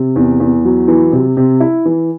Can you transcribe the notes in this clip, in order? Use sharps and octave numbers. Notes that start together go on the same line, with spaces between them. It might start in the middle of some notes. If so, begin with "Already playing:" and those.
Already playing: C3
E2
E2
F#3
E3
C3
C3
E4
E3